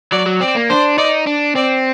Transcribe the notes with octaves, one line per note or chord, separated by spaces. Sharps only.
F#3 D5
F#3
C4 D5
A#3
D4 C5
D#4 D5
D4
C4 D5